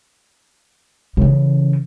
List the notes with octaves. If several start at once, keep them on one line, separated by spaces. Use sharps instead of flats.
C#3 E3